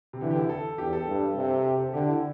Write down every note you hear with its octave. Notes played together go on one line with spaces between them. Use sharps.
C3
D3 E3
G4
E4
A4
E2 G4
A4
G2
C3
G4
A4
D3 G4
E4